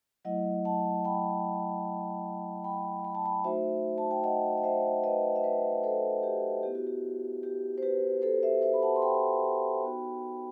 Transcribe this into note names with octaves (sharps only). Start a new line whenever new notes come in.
F#3 A3 E4 D#5 F#5
F#5 A5
G5 B5
G5 B5
B5
A5
G5 B5
A3 D#4 F#4 C5 E5
A5
G5
D#5 F#5
D#5
C5 E5
B4 D#5
E5
B4 D#5
A4 C5
G4 B4
B3 E4 G4
F#4
G4
G4
C5
G4 B4
A4 C5
C5 E5
C5 E5
B5
F#5 A5
C6
G5 B5
B3 D#4 F#4